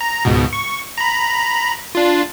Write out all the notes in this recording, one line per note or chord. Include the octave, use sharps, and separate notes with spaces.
A#5
C#2 G#2 B2
C#6
A#5 B5
D4 F4